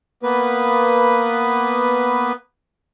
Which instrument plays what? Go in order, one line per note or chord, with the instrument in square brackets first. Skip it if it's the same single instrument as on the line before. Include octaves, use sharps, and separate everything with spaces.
[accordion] A#3 B3 B4